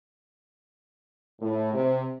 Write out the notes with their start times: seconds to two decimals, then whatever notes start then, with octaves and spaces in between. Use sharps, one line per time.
1.40 A2
1.73 C3